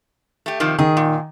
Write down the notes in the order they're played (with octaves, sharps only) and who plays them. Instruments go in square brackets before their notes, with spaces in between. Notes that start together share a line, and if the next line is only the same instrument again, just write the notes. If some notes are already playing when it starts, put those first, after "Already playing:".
[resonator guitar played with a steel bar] A3 G4
C3 D#3 F3
[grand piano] D#3 [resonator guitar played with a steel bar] G#4
[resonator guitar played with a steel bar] A#2